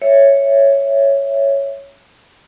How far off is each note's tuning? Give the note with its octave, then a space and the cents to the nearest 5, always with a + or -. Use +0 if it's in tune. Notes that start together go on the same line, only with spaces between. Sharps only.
C#5 +0 E5 +5